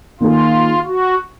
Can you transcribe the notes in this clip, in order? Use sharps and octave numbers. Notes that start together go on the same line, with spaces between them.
D#3 A#3 D#4 F4 G#4
F#4